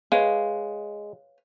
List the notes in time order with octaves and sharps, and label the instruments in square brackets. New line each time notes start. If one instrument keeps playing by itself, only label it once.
[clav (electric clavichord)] G#3 [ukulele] B4 C#5 F5